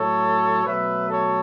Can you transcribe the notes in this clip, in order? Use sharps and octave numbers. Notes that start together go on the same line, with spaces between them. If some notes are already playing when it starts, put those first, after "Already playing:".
Already playing: A2 F#3 A3 A4 C#5
B2 F#3 A3 B4 E5
A4 C#5